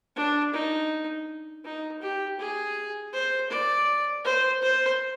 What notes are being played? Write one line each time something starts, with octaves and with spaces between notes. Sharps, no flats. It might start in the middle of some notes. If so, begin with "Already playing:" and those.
D4
D#4
D#4
G4
G#4
C5
D5
C5
C5